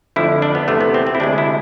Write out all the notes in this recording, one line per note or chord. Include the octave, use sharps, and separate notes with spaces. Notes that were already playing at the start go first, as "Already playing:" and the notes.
F2 D3 F3 A3 E4
D4
B3
E2 C3 E3 A3
B3
C4
C4
E4
D2 C3 G#3 D4
E4